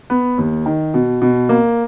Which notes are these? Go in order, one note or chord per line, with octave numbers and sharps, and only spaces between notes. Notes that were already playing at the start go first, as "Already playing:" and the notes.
B3
D#2
D#3
B2
B2
A#3